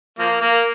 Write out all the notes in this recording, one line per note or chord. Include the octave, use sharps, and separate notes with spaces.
F3 A#3
A#3